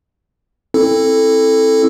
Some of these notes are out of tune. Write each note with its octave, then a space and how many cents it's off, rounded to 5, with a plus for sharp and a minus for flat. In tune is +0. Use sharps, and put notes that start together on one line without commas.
C4 +25 E4 +0 A4 +0